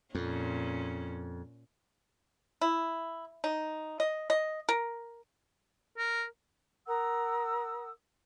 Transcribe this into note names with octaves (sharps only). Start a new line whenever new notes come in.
F2 A#2 C#4
E4
D#4
D#5
D#5
A#4
A#4
A#4 F#5 D#6 E6